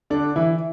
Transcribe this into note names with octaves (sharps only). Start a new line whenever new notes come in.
D3 D4
E3 E4